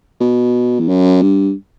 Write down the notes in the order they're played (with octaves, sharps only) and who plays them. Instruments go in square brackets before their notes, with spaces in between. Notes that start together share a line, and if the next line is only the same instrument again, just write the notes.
[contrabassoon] B2
E2
F#2
G2